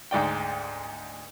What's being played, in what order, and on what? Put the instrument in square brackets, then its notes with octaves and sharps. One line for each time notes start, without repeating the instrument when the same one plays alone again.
[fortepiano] D2 G#2 D5 G5